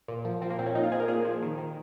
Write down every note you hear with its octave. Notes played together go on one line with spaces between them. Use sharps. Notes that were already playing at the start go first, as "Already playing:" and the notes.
A#2
F3
F3 C4
A#3
A#2 C4
C#4
A#2 D#4
F4
F3 G#4
A#4
A#2 G#4
F3
D#3
D#3